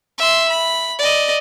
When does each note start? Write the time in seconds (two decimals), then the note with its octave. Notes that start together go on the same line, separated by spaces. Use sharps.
0.18 E5 C6
0.49 B5
0.98 D5 D#5